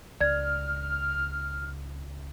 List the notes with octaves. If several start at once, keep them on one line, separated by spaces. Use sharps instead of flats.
C#2 D5 F6 G#6